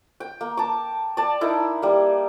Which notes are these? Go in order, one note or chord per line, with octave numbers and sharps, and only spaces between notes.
G5
A#3
A5 D6
D5 A5
D#4 E4 A#4
G3 A#3